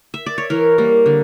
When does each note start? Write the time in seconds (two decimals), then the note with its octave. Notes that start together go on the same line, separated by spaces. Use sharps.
0.14 E5
0.26 D5
0.38 C#5
0.50 E3 A#4
0.78 G3 A#3
1.06 D3